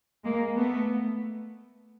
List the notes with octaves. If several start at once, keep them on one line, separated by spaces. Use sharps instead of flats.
G#3 A#3
A3 B3